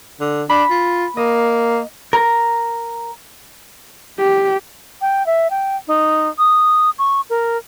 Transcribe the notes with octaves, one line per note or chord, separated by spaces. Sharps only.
D3
D4 B5
F4
A#3 D#5
A#4
G4
G5
E5
G5
D#4
D#6
C#6
A#4